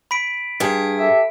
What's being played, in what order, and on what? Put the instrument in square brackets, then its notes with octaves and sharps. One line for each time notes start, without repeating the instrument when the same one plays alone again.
[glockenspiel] B5 B6 D7
[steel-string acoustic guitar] G2 G#4
[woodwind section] G4 A4 E5